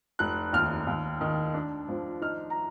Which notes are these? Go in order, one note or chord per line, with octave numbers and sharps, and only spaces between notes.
F1 F#6
D#2 F6
D#2
D#3
D4
F3
D#4 F6
A#5